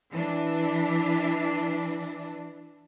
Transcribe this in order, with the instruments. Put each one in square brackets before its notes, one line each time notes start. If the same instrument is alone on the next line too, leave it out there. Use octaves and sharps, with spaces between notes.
[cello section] E3 D4